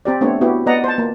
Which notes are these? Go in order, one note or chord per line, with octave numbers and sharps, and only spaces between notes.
C4 G4 D5
A3 B3 C4 D4 C#5
B3 E4 F#4 G4
B3 D5 D#5 F#5 A#5
C5 A5
A#3